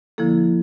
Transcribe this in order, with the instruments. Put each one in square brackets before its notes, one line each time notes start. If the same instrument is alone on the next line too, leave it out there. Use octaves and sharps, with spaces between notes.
[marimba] D3 F3 A#3 E4 A4